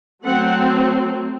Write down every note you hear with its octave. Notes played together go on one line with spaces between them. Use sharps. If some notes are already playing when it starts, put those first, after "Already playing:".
F#3 A3 C4 F#5